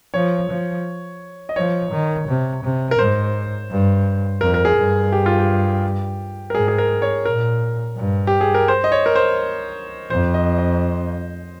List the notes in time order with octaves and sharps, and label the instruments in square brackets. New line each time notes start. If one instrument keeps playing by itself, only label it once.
[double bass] F3 [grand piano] C#5
[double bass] F3
[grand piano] D#5
[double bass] F3 [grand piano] C#5
[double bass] D#3
C3
C3
[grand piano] A#4
[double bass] G#2 [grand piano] C5
[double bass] G2
[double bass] F2 [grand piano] A#4
[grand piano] A#4
G#4
[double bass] G2
[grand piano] G4
F4
G4
A#4
[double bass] G#2 [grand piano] G#4
[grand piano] G#4
A#4
C#5
[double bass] A#2 [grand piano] A#4
[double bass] G2
[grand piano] G4
G#4
A#4
C5
D#5
C#5
A#4
C5
[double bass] F2 [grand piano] C5
[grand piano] D#5
D#5